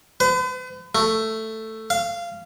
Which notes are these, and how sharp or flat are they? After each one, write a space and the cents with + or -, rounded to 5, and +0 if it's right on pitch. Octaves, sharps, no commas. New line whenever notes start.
B4 +45
A3 +5
F5 -20